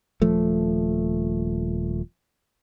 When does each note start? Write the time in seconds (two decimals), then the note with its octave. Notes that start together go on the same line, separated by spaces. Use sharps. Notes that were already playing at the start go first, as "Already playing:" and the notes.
0.22 D#1 F3 A3